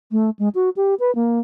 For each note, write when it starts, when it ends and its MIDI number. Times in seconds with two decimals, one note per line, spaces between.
0.12 0.30 57
0.39 0.49 56
0.55 0.70 66
0.76 0.95 67
1.00 1.14 71
1.15 1.40 58